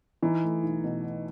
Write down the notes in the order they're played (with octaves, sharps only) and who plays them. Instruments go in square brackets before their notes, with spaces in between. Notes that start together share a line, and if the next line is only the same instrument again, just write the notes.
[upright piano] E3 [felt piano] D#4
[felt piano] A3
B1
B2
D#4